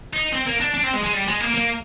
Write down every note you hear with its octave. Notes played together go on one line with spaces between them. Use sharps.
D#4
C4
A#3
D4
D4
C4
G#3
G#3
G3
G#3
A#3
A#3